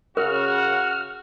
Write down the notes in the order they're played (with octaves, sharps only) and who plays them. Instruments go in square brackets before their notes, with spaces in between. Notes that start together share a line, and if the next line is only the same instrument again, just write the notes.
[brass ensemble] C#3 [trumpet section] F#4 [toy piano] A#4 [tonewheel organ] F6